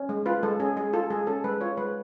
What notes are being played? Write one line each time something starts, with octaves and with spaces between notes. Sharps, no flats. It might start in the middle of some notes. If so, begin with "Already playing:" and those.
Already playing: C#4
G#3
F4 B4
G#3 A4
C#4 G#4
G#3 G#4
F4 A4
G#3 G#4
C#4 A4
G#3 B4
F4 C#5
G#3 B4